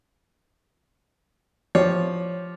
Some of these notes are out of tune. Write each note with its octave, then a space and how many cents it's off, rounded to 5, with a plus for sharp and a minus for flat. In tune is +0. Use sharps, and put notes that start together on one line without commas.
F3 +0 G4 +0 C#5 +0